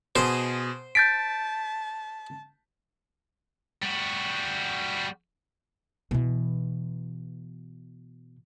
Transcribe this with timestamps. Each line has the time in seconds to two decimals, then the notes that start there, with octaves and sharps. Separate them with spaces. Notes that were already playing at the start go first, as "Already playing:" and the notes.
0.16 B2 G#4 C5
0.95 A5 G6 A6 B6 D7
3.83 G3 F#4
6.11 B2 E3